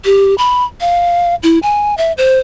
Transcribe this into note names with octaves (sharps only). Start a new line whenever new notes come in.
G4
B5
F5
E4
G#5
E5
C5